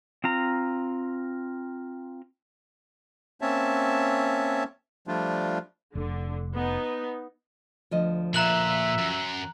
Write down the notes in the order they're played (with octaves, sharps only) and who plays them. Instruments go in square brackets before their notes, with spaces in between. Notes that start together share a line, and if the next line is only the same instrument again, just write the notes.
[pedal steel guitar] C4 F4 A#5
[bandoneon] A#3 C4 C#4 C#5 E5 A5
F3 G3 A3 D4 F4
[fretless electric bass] F1 [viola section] D3
[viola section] B3 D#4
[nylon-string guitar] D2 F3 D#5
[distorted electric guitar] A#2 [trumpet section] E5 [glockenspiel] A#5 F#6 F#7
[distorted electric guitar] F#2